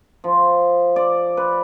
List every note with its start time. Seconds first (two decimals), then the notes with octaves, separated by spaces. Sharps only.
0.24 F3
0.96 D5
1.37 B4